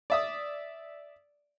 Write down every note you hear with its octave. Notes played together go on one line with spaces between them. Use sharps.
D5 E5 D#6